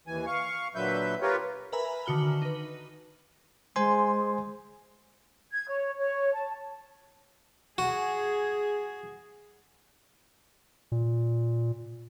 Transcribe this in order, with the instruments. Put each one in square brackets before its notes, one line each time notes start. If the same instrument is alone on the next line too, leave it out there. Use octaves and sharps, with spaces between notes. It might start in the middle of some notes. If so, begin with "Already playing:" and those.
[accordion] D#2 E3 G#5
F5 C#6
A#2 D3 F#3 B4 E5 G6
F4 G4 A#4 B4 C#5
[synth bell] A#4 B4 E5 G#5 A#5 B5
D3 D#3 F#4 F6 G7
D#4 B4
[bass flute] G#3 [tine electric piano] C5 G#5 C6
[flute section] G#6
C#5
C#5
A5
[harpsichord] F#4 [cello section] G#4
[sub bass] A#2